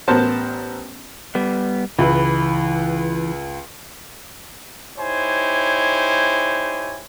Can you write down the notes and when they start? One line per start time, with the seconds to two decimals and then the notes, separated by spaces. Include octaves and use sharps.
0.08 A1 B3 A#4 C5 A5
1.35 G3 B3
1.99 C#2 E3 B4
4.99 D#4 E4 G4 C5 C#5 G#5